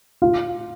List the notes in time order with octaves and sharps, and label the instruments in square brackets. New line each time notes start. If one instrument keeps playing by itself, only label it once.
[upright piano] F4 F5